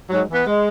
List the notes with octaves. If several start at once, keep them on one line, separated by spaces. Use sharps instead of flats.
G#2 F#3
E3
B3
G#3